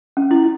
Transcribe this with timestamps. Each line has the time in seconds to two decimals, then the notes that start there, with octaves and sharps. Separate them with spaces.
0.17 C#4
0.31 E4